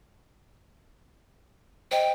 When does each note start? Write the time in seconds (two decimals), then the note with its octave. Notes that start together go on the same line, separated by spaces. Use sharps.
1.91 C5 D#5 G5